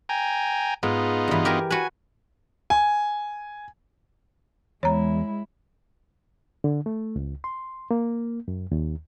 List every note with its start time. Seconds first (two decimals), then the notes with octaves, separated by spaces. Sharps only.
0.09 G5 G#5 A#5
0.83 G#2 B3 D#4 F4
1.28 G2 E3
1.45 G4 A#4 G#5
1.70 F#4 B4 G#5
2.70 G#5
4.83 E2 G#3 E4 C#5 A#5
6.64 D3
6.86 A3
7.16 C#2
7.44 C6
7.91 A#3
8.48 F#2
8.72 D#2